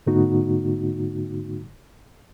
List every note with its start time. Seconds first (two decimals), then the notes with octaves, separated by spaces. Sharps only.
0.07 G#2 D3 A3 B3 D#4 F#4